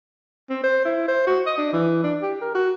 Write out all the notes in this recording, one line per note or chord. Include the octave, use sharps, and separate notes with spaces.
C4
C5
E4
C5
F#4
D#5
D4
E3
D4
G4
A#4
F#4